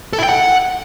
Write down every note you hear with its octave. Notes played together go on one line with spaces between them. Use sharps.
A4
E4
G5
F#5